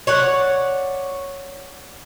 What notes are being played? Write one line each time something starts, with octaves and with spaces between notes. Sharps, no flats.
C#5 D5 F#5